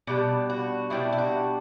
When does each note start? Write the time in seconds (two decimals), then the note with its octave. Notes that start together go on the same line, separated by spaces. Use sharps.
0.07 B2 G3 D4 D5
0.50 F#4
0.90 B2 G3 D4 E4
1.13 E4
1.18 F#4